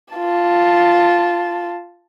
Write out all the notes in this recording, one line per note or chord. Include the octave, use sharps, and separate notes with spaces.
F4 A5